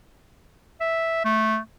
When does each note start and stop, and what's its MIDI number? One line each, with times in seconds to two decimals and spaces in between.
0.80 1.24 76
1.25 1.58 57